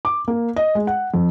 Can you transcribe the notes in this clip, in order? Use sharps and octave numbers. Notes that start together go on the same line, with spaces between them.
D6
A#3
D#5
G#3
F#5
F2